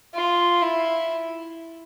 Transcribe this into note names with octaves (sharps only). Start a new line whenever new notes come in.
F4
E4